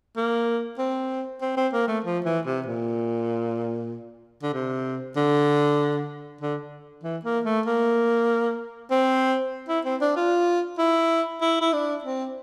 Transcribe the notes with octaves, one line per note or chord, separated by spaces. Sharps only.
A#3
C4
C4
C4
A#3
A3
F3
E3
C3
A#2
D3
C3
D3
D3
E3
A#3
A3
A#3
C4
E4
C4
D4
F4
E4
E4
E4
D4
C4